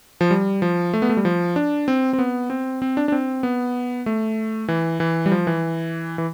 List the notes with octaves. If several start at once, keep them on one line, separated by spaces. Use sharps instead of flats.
F3
G3
F3
A3
B3
A3
G3
F3
D4
C4
C4
B3
C4
C4
D4
D4
C4
B3
A3
E3
E3
G3
F3
E3
E3